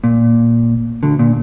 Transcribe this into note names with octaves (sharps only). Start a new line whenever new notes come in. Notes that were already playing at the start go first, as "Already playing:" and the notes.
A#2
D2 D3
A#2